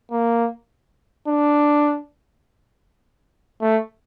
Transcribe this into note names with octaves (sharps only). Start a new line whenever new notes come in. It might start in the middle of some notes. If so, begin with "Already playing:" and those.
A#3
D4
A3